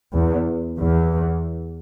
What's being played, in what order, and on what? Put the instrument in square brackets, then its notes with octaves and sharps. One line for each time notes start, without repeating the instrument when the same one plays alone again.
[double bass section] E2
E2